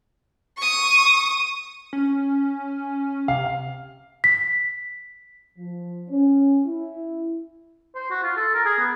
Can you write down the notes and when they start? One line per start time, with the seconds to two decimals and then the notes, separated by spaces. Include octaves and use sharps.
0.58 C#6 D#6
1.93 C#4
3.28 C3 F5
4.24 B6
5.57 F3
6.09 C#4
6.66 E4
7.95 C5
8.10 F#4
8.23 F4
8.37 A4
8.54 A#4
8.65 G#4
8.79 B3